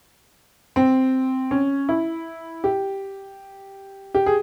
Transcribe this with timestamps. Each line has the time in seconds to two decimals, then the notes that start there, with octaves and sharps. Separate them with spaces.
0.76 C4
1.51 C#4
1.89 E4
2.64 G4
4.14 G4
4.26 G#4